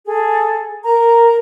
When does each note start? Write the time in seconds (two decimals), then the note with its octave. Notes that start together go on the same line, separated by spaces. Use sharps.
0.05 G#4 A4
0.84 A#4 A#5